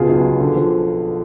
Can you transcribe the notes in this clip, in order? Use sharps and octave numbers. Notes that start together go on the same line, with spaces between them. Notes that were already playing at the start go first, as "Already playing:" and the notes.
Already playing: C#2 B2 F4 G#4
B1
B2
D3
F3